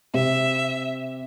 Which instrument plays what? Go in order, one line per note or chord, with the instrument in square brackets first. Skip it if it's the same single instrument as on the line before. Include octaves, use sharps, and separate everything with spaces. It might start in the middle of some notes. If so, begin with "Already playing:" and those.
[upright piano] C3 [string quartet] E5